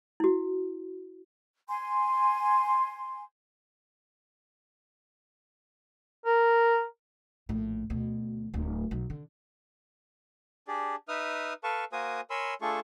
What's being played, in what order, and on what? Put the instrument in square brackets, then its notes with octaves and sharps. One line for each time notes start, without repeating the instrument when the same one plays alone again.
[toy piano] E4 F#4
[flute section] G#5 C6
[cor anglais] A#4
[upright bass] A#1 A2
D2 B2
D1 D2
B1
D3
[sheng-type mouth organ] D4 G4 G#4 D5
D#4 B4 E5 D#6 F6
A4 B4 F5 A5 C#6
A#3 F#4 A#4 C5 G#5 D#6
A#4 C#5 G#5 B5 C6 E6
A3 D4 F4 G#4 A4 C#6